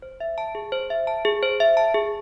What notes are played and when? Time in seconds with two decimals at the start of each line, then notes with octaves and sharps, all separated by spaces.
0.02 C5
0.20 E5
0.38 A5
0.55 G#4
0.72 C5
0.90 E5
1.07 A5
1.25 G#4
1.43 C5
1.60 E5
1.77 A5
1.94 G#4